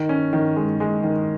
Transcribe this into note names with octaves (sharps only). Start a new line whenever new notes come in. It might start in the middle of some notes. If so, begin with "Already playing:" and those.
Already playing: D#3
C#4
D#3
G#3
G#3
D#3